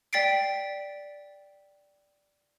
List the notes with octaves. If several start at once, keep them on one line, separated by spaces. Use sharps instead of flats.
D5 G5 A6 B6 C7 D7